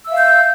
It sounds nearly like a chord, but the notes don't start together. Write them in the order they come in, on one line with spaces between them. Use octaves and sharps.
E6 E5 F5 G6